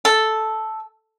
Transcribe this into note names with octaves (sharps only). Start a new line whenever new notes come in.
A4